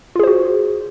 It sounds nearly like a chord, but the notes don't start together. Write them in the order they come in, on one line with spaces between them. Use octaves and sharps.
F4 G#4 C5 F#4